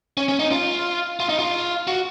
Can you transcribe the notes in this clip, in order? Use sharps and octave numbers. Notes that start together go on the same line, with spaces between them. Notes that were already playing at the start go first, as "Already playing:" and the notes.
C#4
C#4
D#4
F4
F4
D#4
F4
F#4